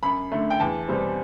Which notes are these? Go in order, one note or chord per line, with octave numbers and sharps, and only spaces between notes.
F#2 B5
D3 A3
G5
E2 A5
B2 G3 C4